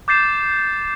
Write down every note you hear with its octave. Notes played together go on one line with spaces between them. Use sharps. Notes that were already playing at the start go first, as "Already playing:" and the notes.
D6 G6 A6 C7 E7